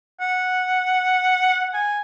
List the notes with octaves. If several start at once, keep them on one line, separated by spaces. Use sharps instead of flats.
F#5
G#5